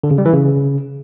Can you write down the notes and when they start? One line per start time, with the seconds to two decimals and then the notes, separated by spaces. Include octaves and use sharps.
0.04 D3
0.11 C#3
0.18 G3
0.25 E3
0.33 C#3